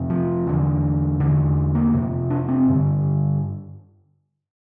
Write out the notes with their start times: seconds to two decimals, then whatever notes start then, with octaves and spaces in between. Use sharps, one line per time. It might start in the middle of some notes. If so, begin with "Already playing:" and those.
Already playing: F2 C3
0.10 F3
0.47 E2 D3
1.20 E2 D3
1.75 A#3
1.93 F2 C3
2.30 D4
2.49 C4
2.67 G2 D3